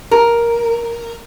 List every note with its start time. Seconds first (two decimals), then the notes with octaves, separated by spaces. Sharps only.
0.11 A#4